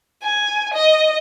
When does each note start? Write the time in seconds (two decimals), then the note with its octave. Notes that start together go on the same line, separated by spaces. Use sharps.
0.23 G#5
0.74 D#5